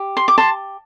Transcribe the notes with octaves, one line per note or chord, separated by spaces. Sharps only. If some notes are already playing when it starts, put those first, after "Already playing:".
Already playing: G4
C6
D6
A5 C6